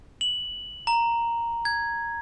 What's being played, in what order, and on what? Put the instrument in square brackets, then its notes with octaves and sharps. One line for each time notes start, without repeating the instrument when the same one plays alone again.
[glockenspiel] F#7
A#5
G#6